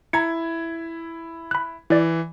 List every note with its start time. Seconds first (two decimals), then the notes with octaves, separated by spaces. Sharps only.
0.13 E4 A#5 G#6 C#7
1.51 B5 F#6
1.90 E3 E4 D5